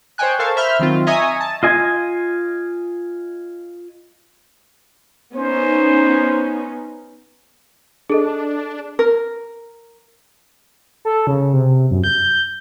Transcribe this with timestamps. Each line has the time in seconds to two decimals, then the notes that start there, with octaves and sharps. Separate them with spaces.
0.18 C5 C#5 D#5 G5 G#5 F#6
0.39 A4 A#4 C5 F5 A5 C#6
0.56 C5 E5 B5 F6 G6
0.79 D#3 F#3 C4 F4
1.07 D#5 E5 G#5 A#5 C#6 D#6
1.41 A5
1.63 F4 D#5 G#5
5.35 B3 C#4 D#4 C5
8.10 D4 G#4 A4 D#5
8.99 A#4
11.05 A4
11.27 C#3
11.53 C3
11.91 F#2
12.04 G6